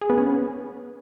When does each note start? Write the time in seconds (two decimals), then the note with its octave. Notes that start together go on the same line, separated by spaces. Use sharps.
0.01 G#4
0.10 B3
0.18 C#4